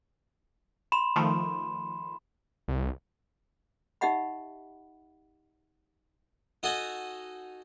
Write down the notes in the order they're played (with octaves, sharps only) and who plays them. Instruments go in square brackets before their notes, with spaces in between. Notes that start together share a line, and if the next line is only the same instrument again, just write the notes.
[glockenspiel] B5 C6 E7
[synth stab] D#3 F3 A3
[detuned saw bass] C2
[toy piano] D#4 G4 D#5 E5 F#5 B5
[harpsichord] D#4 F#4 A4 D#5 F#5 G#5